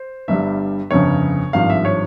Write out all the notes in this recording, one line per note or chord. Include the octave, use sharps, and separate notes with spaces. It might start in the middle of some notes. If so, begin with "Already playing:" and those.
Already playing: C5
G1 G2 G3 E5
G1 F2 C#3 C#5
G#1 G2 F3 F5
E5
C#5